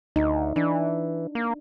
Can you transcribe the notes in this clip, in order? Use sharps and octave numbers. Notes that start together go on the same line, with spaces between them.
D2 D#4
E3 D4
A#3